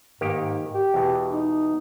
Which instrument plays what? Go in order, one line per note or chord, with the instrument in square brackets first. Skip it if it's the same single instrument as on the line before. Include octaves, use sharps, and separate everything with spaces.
[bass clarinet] G#2 [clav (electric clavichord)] D#3 A#3 G4
[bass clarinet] G4
[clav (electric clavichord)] E2 B2
[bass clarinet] D#4